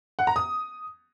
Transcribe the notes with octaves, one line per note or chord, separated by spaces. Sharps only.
F#5
A#5
D#6